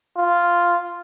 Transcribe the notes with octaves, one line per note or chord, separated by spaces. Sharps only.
F4